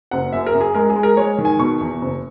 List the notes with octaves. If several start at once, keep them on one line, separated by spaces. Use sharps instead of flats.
F#1 F#5
F#2 E5
A#4
F#2
G#4
G#3 A#4
G#4
G#3
A#4
G#3 C#5
D#3
G#5
B2 C#6
E2
F#1